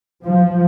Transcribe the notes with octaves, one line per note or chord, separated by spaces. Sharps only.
F3